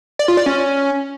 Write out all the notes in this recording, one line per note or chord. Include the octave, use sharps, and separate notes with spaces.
D5
F4
D5
C#4